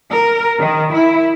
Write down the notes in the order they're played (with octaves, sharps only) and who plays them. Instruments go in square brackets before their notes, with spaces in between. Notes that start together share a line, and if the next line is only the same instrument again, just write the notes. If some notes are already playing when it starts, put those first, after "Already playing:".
[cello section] A#4
D#3
E4